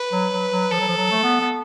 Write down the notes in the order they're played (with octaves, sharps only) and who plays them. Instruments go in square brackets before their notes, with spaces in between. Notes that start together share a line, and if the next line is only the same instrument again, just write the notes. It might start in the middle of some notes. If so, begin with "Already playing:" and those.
Already playing: [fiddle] B4
[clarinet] F#3
F#3
F#3
[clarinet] F3 [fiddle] A4
[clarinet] F#3
F3
F#3
A3
B3
B3